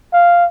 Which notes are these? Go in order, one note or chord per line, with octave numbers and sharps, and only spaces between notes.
F5